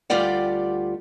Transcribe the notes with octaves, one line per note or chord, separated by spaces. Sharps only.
D2 G3 F4 G4 D5 F#5